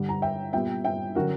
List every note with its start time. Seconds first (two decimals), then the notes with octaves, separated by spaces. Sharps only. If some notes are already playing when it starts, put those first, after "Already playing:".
Already playing: G2 D3 G3 F#5
0.09 A#5
0.22 E5 G5
0.53 A#2 G3 B3 E5 G5
0.84 E5 G5
1.15 D3 F#3 C#4 F#4 A#4